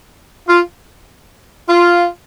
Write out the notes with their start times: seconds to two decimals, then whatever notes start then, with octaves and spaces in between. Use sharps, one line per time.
0.48 F4
1.69 F4